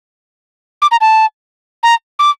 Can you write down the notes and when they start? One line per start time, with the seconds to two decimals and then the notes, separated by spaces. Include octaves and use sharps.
0.82 D6
0.91 A#5
1.01 A5
1.83 A#5
2.19 D6